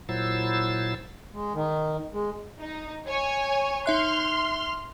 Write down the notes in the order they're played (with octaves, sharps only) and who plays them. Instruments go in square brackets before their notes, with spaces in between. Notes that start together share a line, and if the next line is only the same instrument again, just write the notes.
[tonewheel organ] A#2 F#3 E4 C5 E6 A6
[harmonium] G#3
D#3
G#3
[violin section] D#4
C#5 G#5
[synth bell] D#4 E5 F#6 [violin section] C6 F6